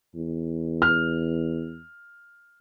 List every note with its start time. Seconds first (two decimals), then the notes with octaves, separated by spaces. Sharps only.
0.15 E2
0.82 F6